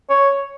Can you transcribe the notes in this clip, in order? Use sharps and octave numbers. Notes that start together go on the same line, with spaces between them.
C#5